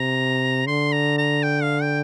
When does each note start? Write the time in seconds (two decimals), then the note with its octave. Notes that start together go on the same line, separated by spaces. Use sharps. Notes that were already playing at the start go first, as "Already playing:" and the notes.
Already playing: C3 A#5
0.67 D3 C6
0.92 A#5
1.18 A#5
1.43 G5
1.62 F5
1.81 G5